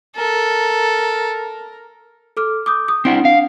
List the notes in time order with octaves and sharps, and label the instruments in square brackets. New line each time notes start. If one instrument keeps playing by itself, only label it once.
[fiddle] A4 [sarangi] A#4
[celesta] A4 D6 F6
D6 D#6 G6
D#6
[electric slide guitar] C4 E4 [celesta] D4 F#5 D7
[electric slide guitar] F5